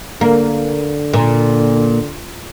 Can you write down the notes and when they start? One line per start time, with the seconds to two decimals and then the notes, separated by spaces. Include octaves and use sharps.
0.21 D3 A#3
1.13 A#2